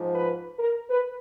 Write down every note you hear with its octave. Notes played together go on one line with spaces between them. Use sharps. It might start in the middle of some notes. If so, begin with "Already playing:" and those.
Already playing: G#2 F3
B4
A#4
B4